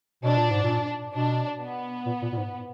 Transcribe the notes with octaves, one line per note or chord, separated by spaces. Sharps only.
B2 D4
A#2
G#2
A#2
B2 D4
B3
A#2
A#2
A#2
G#2